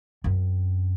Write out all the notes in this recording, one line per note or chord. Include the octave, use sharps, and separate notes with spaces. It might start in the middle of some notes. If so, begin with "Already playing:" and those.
F#2 C4